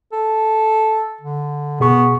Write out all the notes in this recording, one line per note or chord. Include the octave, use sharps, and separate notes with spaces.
A4
D3
B2 B3 G#4 C#6